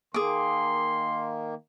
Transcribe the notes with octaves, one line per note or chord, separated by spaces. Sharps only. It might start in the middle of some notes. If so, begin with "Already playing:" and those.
D#3 A#3 G#4 C6 D6